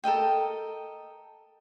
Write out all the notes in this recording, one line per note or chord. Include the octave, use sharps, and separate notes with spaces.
A4 A#4 D#5 G5